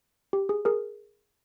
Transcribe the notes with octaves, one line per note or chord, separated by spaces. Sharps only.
G4
G#4
G#4 A#4